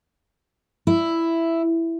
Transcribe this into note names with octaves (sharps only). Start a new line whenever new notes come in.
E4